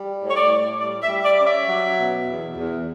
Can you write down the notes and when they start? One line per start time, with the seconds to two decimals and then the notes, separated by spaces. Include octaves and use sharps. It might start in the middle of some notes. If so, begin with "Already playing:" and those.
Already playing: G3
0.22 A2
0.31 C#5
0.36 D5
0.51 A2
0.80 G3 D5
1.03 E5
1.09 G3
1.25 D5
1.39 C#4 D5
1.47 E5
1.68 F#3
1.98 B2
2.27 E2
2.56 E2